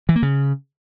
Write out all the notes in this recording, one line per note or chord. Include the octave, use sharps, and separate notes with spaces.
E3
A#3
C#3